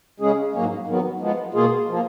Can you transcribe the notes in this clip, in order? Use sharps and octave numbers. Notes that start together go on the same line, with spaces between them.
C#3 G#3 C#4 G#4
G#2 F#3 A#3 C#4
D#3 F#3 B3
F3 G#3 B3
B2 A#3 F4 G#4
F3 A#3